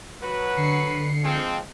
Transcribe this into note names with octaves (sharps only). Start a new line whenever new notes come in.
F#3 F#4 B4
D3 C7 C#7
F3 G#3 C4